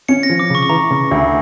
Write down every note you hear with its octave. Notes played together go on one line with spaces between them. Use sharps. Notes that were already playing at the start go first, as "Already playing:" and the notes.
C#4 C#7
A#6
F3
D6
C#3 C#6
C#6
E3 A#5
C#3
D2